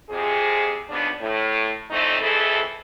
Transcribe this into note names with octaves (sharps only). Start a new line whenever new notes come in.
F2 C3 G#4
D#2 C#3 F3 B3 D4
A2
F2 D3 E3 A3 C4 D#4
F2 E3 C4 E4 G#4 A4